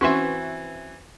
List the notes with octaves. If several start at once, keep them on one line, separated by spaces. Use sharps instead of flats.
E3 C4 C#4 F#4 B4 E5 C6 C#6